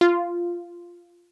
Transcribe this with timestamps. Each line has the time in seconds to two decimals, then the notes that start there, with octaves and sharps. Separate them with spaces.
0.01 F4